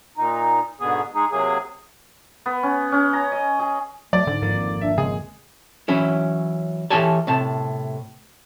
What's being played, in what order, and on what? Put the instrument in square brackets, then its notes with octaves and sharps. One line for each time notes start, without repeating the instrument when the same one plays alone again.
[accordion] A#2 D#4
G#2 B2 D3 B3 G#4
G#3 D#4 G#4
C3 F#3 A#3 G#4
[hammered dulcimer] B3
C#4
C#4
A#5
D#5
G#4
[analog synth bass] F#3 [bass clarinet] A3 [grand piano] D5
[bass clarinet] G#2 [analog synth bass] D3
[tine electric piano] G#1 F2 A#3
[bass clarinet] G#2
[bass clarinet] D4 [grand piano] E5
[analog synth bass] C#3 [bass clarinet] G#3 [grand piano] G#4
[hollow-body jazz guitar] E3 F#3 C#4 E4
E3 G4 A4 C#5 G#5 A5
A2 C3 A5